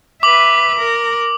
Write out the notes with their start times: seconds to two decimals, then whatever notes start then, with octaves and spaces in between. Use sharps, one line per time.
0.23 B4 E5 D6 F#7
0.79 A#4